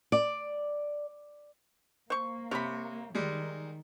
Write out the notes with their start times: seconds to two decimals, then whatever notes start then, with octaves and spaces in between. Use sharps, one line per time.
0.12 D5
2.10 A#3 C5 C#6
2.51 C3 C#5 B5
3.15 D#3 G3 G#3